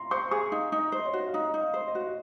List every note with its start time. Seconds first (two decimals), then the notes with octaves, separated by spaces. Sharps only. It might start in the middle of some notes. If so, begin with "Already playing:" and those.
Already playing: A#5 C6
0.11 C5 C#6
0.31 G#4 C#6
0.52 D#4 F5
0.72 D#4
0.79 D#5
0.92 C5
0.99 D#5
1.06 C#5
1.13 F#4
1.27 F5
1.34 D#4 D#5
1.49 D#4 D#5
1.61 F5
1.74 C5
1.88 D#5
1.95 F#4
2.07 D#5